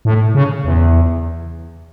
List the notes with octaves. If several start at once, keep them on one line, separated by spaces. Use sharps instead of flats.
A2
C#3
E2